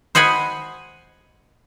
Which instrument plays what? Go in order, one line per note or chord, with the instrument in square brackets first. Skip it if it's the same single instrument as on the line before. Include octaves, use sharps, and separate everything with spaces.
[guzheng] C5 D#5 F#5 G#5 B5